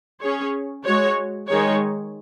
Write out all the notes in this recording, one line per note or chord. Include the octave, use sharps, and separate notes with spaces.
C#4 G#4 C#5
G#3 F#4 C#5
D#3 G#3 D#4 G#4 C#5